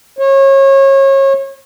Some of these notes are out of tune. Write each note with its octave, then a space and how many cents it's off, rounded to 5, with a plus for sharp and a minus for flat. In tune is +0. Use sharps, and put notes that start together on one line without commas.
C#5 -30